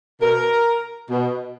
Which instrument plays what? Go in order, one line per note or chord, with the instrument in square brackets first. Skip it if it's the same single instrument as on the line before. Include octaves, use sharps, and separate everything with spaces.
[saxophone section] B2 A#4
B2